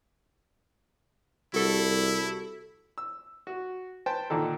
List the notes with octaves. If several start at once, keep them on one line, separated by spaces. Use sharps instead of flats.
C2 E4 F#4 A4
E6
F#4
B4 C5 G5 A5
A#2 D3 D#3 A4